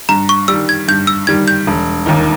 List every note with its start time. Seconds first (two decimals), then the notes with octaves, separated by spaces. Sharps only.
0.09 G2 A#5
0.29 C#6
0.48 D#3 G3 E6
0.69 G#6
0.88 G2 G6
1.07 E6
1.27 D#3 G3 G#6
1.48 G6
1.67 E1
2.06 D#2 D#3 A#3 D#4